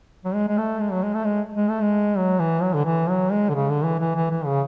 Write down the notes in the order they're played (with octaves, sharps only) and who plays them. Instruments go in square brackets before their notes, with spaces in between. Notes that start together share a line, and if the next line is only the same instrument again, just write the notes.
[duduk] F#3
G#3
G#3
A3
G#3
F#3
G#3
A3
G#3
G#3
A3
G#3
F#3
E3
F#3
D3
E3
F#3
G#3
D3
C#3
D3
E3
E3
E3
E3
C#3